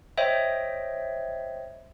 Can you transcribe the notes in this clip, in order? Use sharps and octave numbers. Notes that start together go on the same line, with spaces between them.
C5 C#5 D#5 E5 G5